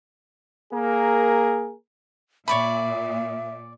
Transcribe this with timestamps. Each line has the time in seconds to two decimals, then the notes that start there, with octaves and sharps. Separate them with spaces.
0.73 A#3 G#4 A#4
2.48 A#2 C#5 D5 E5 B5